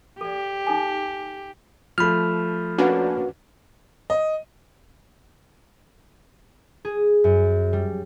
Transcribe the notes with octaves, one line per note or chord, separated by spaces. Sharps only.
G4 A4 D5
D#4 A4 G#5
F3 A3 B5 F6
A#3 C#4 D4 F#4 B4 F#5
D#5
G#4
F#2
G3